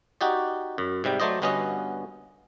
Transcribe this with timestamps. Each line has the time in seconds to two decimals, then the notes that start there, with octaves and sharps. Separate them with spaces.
0.21 D#4 F#4 G4 D5
0.78 F#2
1.04 G#2 C3 G3 G5
1.20 F#3 A3 C5 D5 D#5
1.42 G1 G2 B3 C#4 F#4 D#5